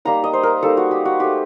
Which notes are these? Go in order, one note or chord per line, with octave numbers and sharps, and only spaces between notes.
G3 A#3 D#4 A#5
D#5
C5
A#4
G3 A#3 D#4 A4
F#4
G4
F#4
A3 D#4 G4